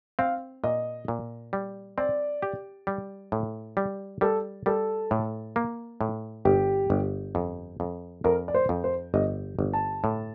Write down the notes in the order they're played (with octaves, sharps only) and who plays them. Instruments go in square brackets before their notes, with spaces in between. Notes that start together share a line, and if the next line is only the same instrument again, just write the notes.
[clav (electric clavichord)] C4 [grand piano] F5
[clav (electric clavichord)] A#2 [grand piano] D#5
[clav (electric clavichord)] A#2
G3
[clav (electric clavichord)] C4 [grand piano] D5
[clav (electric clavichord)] G4
G3
A2
G3
[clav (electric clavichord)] G3 [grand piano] A4
[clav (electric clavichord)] G3 [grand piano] A4
[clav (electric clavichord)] A2
A#3
A2
[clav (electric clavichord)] G1 [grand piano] G4
[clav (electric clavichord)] G1
F2
F2
[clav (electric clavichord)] F2 [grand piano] A#4
[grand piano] D5
C5
[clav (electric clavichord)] F2
[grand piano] C5
[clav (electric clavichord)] G1 [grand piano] D#5
[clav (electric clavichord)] G1
[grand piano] A5
[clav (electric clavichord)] A2